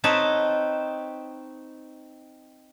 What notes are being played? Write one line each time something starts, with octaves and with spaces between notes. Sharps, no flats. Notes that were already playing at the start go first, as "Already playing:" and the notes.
C4 D#4 B4 C#5 A5